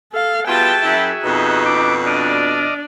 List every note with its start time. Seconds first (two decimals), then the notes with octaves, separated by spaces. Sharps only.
0.13 A4 F5
0.47 G3 B3 F4 F#4 G#4 E5 G5 A5
0.83 F#2 E4
1.24 F2 B2 D#4
1.66 D4 E4 D6
2.07 D4 D5 D#5 F6